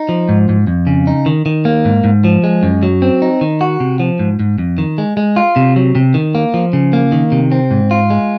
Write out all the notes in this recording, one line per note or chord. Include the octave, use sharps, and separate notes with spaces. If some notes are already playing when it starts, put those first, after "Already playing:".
Already playing: D#4
F3
G#2
G#2
F2
C#3
D#4
D#3
D#3
A#3
G#2
G#2
F3
G#3
F#2
F#3
C4
D#4
D#3
F#4
C3
F3
G#2
G#2
F2
D#3
G#3
G#3
F4
C3
F#3
C3
D#3
A#3
F3
C#3
A#3
D#3
C3
C4
G#2
F4
G#3